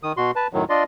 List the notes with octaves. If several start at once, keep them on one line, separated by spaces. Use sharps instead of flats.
D#3 D#6
B2 F#4 C6
B4 A5
F#2 A2 D#3 F#3
D4 F4 D5 D#5 C6